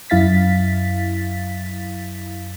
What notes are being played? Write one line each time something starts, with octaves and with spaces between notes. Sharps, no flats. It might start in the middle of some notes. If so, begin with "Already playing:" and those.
F#2 E4 F5 A6 B6